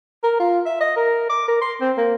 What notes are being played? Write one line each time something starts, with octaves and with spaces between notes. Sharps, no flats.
A#4
F4
E5
D#5
A#4
D6
A#4
C6
C4
A#3